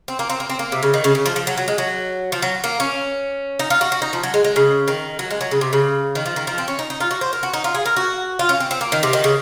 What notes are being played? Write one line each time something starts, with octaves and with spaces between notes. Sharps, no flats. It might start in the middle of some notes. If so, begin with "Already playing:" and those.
C4
A#3
C4
A#3
C4
A#3
C3
C#3
D#3
C#3
C#3
F3
F3
F#3
F#3
G#3
F#3
F3
F#3
A#3
C#4
D#4
F4
F#4
F#4
D#4
F3
F#3
G#3
G#3
C#3
D#3
F#3
G#3
F#3
C#3
C3
C#3
D#3
F3
D#3
F3
C4
C#4
D#4
D#4
F4
F#4
C5
A#4
F#4
D#4
F4
G#4
A#4
F#4
F4
C#4
C4
C4
A#3
D#3
C3
D#3
C#3